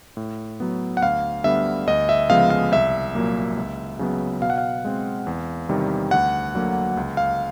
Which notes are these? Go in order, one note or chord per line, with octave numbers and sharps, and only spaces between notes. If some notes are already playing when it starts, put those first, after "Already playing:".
A2
F#3 B3
F#5
D2 F5
D3 G3 B3 E5
D2 D#5
E5
C#3 F3 G#3 B3 F5
F5
C2 E5
A#2 F#3 A#3
C#2
C#3 F#3 B3
B2 F5
F#5
F5
G#3 C4
E2
C3 D#3 G3
D2 F#5
D3 F#3 A#3
C#2
F5